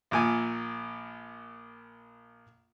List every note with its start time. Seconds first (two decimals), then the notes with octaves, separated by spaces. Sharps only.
0.11 A#1 A#2 G#5